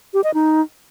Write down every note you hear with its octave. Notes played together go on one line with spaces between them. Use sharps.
G4
D#5
D#4